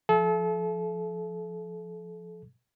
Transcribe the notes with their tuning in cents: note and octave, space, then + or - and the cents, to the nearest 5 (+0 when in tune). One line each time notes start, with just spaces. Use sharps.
F3 +0 A4 -35 E5 +35